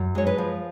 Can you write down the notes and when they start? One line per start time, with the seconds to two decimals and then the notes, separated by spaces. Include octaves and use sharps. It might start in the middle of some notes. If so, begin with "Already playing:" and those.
Already playing: F#2
0.15 G#3 C#5
0.27 B4
0.38 F3